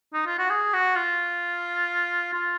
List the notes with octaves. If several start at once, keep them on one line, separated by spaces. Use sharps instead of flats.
D#4
F4
F#4
G#4
F#4
F4
F4